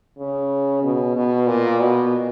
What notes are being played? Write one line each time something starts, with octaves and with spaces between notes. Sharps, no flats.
C#3
B2
B2
A#2
B2